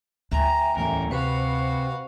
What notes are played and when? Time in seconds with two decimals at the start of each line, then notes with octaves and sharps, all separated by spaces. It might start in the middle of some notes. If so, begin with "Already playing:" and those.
0.32 D2 E5 G5 G#5 A#5
0.77 E2 A2 A#4
1.11 C3 F#4 B4 C5 F5 B5